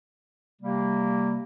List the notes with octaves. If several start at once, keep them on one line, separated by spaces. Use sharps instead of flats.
C3 G3 A#3